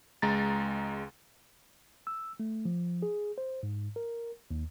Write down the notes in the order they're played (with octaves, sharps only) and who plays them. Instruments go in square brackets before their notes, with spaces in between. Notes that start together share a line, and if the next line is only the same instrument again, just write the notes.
[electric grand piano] C#2 G#3 A#5 A6
[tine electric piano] E6
A3
F3
G#4
C5
G#2
A#4
D#2